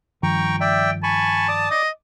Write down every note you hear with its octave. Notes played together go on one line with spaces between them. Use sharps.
G2 D#3 F3 G5 A#5 C#6
D5 E5 G5
G#5 A5 B5 C#6
D5 D6 D#6
D#5